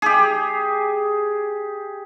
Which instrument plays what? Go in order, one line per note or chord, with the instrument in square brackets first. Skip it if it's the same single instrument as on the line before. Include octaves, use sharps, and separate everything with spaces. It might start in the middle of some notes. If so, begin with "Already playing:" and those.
[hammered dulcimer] G4 G#4